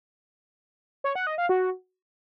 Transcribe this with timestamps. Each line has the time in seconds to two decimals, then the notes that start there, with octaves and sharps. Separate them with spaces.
1.04 C#5
1.15 F#5
1.27 D#5
1.38 F5
1.49 F#4